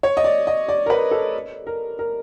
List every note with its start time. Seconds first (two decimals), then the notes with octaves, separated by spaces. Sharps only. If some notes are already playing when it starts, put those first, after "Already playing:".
0.03 C#5
0.17 D#5
0.24 D5
0.47 D#5
0.68 D5
0.86 A#4
0.90 B4
1.11 A4
1.67 A#4
1.99 A#4